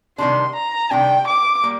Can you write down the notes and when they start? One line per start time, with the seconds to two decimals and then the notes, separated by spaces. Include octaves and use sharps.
0.18 C3 D#3 G3 D4 C6
0.55 A#5
0.91 C3 D#3 G3 D4 G5
1.27 D6
1.64 G3 A#3